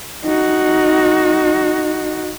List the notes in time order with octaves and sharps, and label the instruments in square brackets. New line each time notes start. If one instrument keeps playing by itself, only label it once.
[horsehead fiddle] D#4 F#4